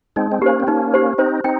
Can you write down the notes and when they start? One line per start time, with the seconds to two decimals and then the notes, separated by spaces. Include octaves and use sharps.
0.16 G#3 C4 D#4
0.32 C4
0.41 A#3 C#4 G4 C5
0.60 C4
0.67 A#3 C#4 D#4
0.94 G4 C5
1.18 C4 D#4 C5
1.44 C4 D#4 G5